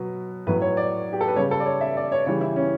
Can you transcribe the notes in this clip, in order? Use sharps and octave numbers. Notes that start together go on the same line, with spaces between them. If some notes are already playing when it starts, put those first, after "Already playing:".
Already playing: B2 F#3 B4
A2 F#3 B4
C#5
D5
G4
A4
B4
C#3 G3 C#5
A4
D5
C#5
E5
D5
C#5
C#3 E3 G3 C#5
E4
C#4